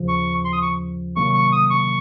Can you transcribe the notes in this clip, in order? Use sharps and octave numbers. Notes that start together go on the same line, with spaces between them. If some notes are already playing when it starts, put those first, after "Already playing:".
Already playing: D#2 C#3 F3
C#6
C6
D#6
C#6
C3 D#3 F#3 A#3 C#6
C#6
D#6
C#6